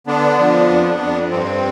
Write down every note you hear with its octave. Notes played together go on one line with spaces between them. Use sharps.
D3 B3 D4
F3
F2
F2
G2 C4